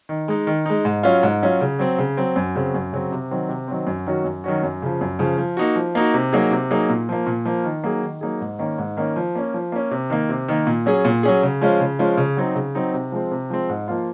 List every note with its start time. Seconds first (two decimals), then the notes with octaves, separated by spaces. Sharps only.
0.09 D#3
0.28 G#3 D#4
0.47 D#3
0.66 G#3 D#4
0.85 G#2
1.03 F#3 C#4 F4
1.23 G#2
1.42 F#3 C#4 F4
1.61 C#3
1.79 F#3 C4
1.98 C#3
2.17 F#3 C4
2.36 F#2
2.55 C#3 F#3 C4
2.74 F#2
2.93 C#3 F#3 C4
3.12 C3
3.31 D#3 F#3 C4
3.49 C3
3.68 D#3 F#3 C4
3.87 F#2
4.06 D#3 F#3 C#4 F#4
4.24 F#2
4.44 D#3 F#3 C#4 F#4
4.63 F#2
4.82 C#3 F3
5.01 F#2
5.19 C#3 F3
5.38 F3
5.57 A#3 D#4 F#4
5.75 F3
5.95 A#3 D#4 F#4
6.14 C3
6.33 F#3 A#3 D#4 G#4
6.51 C3
6.71 F#3 A#3 D#4 G#4
6.89 A#2
7.09 F3 A#3
7.27 A#2
7.45 F3 A#3
7.64 D#3
7.84 F#3 A#3 D#4 G#4
8.02 D#3
8.21 F#3 A#3 D#4 G#4
8.41 G#2
8.59 D#3 A#3 C#4
8.78 G#2
8.97 D#3 A#3 C#4
9.16 F3
9.35 A#3 C#4
9.54 F3
9.72 A#3 C#4
9.91 C3
10.10 D#3 A#3
10.29 C3
10.48 D#3 A#3
10.67 A#2
10.86 F#3 C#4 G#4
11.05 A#2
11.23 F#3 C#4 G#4
11.43 C#3
11.61 F3 G#3 C#4 F4
11.80 C#3
11.99 F3 G#3 C#4 F4
12.17 C#3
12.37 F#3 C4 D#4
12.55 C#3
12.75 F#3 C4 D#4
12.94 C3
13.12 F3 G#3 C4
13.31 C3
13.50 F3 G#3 C4
13.69 G#2
13.88 F3 A#3 F4